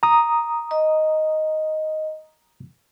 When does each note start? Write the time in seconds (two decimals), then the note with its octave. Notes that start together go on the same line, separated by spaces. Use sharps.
0.03 A#5 D#6
0.71 D#5